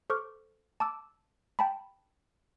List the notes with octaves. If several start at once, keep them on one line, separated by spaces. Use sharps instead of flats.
A4 C5 C#6 D6 F6
A5 D6 E6
G5 A5 B5